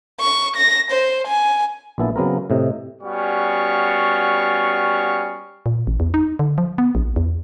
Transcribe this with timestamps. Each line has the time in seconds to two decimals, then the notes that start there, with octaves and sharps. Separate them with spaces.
0.20 C#6
0.56 A#6
0.91 C5
1.27 G#5
1.98 A#1 A#2 B3 E4 A5
2.16 C#3 F#3 B3 C4 A#4
2.50 A2 C3 D#5
3.02 G3 B3 C#4 F#4 F5 C#6
5.66 A#2
5.87 A1
6.00 E2
6.14 D#4
6.39 D3
6.58 F3
6.78 B3
6.95 A#1
7.16 E2